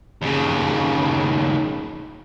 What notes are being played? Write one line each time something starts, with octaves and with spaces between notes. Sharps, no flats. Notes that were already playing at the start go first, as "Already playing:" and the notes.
D#2 C#3